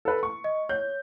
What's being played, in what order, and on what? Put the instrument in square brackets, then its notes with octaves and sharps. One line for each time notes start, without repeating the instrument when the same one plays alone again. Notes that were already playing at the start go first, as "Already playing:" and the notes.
[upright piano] A4 B4
C#6
[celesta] D#5
[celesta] C#5 [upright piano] G6